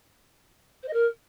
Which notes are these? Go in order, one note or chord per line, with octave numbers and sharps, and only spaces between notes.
C5
D#5
A#4